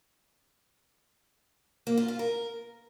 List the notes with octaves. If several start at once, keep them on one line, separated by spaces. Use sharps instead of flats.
A#3
F4
F4
A#4